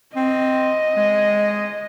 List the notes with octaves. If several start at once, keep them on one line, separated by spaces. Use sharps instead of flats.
C4 D#5
G#3